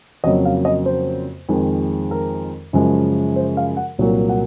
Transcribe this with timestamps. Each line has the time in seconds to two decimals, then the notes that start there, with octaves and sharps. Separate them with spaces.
0.24 F2 C#3 F#3 A#3 D#5
0.45 F5
0.65 D#5
0.86 C5
1.49 F2 D#3 G#3
2.11 A#4
2.73 F#2 C#3 F3 G#3
3.36 C5
3.57 F5
3.77 F#5
3.99 C2 A#2 F#3 A#3
4.29 F#5